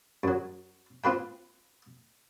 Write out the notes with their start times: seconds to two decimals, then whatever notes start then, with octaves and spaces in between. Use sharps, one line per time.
0.23 F#2 F#3
1.04 C4 F4 B4 G5